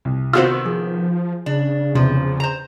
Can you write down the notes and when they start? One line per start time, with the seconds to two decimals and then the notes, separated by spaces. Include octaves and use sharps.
0.05 C2
0.33 C3 D#3 B3 F4 F#4 C5 E6
0.65 F3 G#4
1.46 C#3 D4
1.95 E2 C3 F3 C4
2.40 C5 A#5